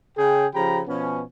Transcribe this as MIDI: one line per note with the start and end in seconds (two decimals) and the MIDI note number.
0.17 0.47 49
0.17 0.47 68
0.17 0.47 79
0.54 0.81 49
0.54 0.81 53
0.54 0.81 67
0.54 0.81 79
0.54 0.81 82
0.54 0.81 83
0.87 1.23 47
0.87 1.23 53
0.87 1.23 59
0.87 1.23 61